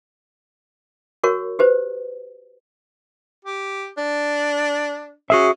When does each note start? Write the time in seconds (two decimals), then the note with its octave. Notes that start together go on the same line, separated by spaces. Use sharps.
1.23 F#4 A#4 C#5 C#6
1.59 G4 B4 C5
3.45 G4
3.98 D4
5.30 C#4 F#4 G#4 E5